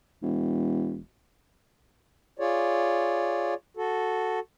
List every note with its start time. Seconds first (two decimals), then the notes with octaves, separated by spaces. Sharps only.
0.22 E1
2.39 F4 G#4 C#5 D5
3.77 F#4 A4